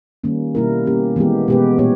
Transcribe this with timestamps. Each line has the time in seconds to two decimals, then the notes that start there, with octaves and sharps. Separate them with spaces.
0.24 D#3 G3 A#3 C#4
0.55 B2 G3 A#3 E4 A#4
0.86 A#3 C#4 G4
1.16 E3 G#3 B3 G4
1.48 B2 G#3 B3 G4 B4
1.78 A#2 G3 B3 G4 C#5